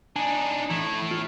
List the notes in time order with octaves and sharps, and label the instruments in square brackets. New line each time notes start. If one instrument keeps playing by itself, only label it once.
[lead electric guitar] D4 D#4 [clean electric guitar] G#5
[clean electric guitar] E3 [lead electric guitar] A3 E4
[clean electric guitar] F4